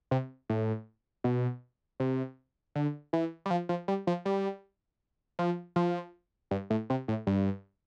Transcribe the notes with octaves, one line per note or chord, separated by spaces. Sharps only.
C3
A2
B2
C3
D3
E3
G3
F3
F3
G3
F3
G3
F3
F3
G2
A2
C3
A2
G2